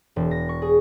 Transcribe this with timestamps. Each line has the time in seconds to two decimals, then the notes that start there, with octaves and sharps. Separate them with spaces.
0.16 E1
0.31 A#6
0.49 C#6
0.62 G#4